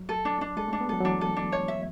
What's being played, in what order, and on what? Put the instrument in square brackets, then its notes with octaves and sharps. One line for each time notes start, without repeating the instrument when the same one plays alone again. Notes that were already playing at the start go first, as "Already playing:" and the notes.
Already playing: [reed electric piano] F#3
[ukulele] A4
D4
D4
[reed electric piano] G#3 [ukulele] A4
[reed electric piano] A3 [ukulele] D4
[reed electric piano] B3
[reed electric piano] F#3 [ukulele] A4
[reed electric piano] F#3
[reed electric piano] E3 [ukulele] D4
[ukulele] A4
D4
C#5
E5